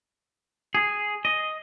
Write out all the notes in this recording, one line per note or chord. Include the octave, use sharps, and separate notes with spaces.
G#4
D#5